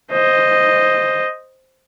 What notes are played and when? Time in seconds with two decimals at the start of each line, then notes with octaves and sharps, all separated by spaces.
0.13 C5 D#5